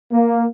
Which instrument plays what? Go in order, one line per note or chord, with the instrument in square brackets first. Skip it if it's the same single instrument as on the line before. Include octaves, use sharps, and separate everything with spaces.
[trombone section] A#3